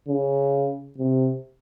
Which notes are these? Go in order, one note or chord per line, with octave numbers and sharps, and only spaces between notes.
C#3
C3